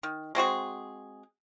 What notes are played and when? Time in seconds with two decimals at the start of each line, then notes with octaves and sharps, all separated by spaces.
0.03 D#3
0.35 G#3 C4 F#4 G#4